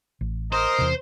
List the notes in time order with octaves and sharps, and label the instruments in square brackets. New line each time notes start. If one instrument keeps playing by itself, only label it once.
[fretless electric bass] A1
[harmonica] A#4 D#5 A#5 [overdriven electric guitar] C5
[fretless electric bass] E2 C3